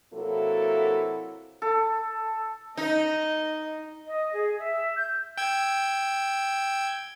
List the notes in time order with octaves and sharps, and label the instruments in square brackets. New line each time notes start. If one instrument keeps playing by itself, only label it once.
[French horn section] C3 F#3 A#3 E4 F#4 A4
[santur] A4
[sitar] D#4 [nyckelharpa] D#5
[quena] D#5
G#4
E5
G6
[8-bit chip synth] G5 E6 G#6